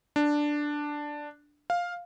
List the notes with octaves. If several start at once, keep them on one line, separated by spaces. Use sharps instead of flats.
D4
F5